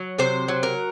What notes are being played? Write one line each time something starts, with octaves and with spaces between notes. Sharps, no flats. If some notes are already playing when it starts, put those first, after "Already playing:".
Already playing: F#3
C3 C5
F#3
A#4